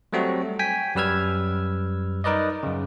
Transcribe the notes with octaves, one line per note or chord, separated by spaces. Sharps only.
F#3 G3 A3 C4 F#4
G5 G#5 B6
F#2 G3 B4 E6 F6 G#6
D#4 A#4 B4 D5 D#5
F#2 C#3